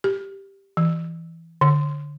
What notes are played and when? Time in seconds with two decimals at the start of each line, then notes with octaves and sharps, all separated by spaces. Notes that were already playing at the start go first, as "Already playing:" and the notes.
0.04 G4
0.77 E3
1.61 D3